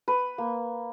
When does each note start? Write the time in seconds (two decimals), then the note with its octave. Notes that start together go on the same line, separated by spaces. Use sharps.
0.08 B4
0.38 A#3